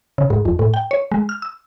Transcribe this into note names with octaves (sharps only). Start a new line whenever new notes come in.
C#3
G#2
F2
A2
G5
C#5
G#3
F6
E6